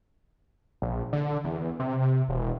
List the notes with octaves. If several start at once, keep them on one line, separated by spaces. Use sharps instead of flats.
A#1
D3
E2
C3
E1